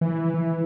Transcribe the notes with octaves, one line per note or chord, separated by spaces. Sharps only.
E3
E3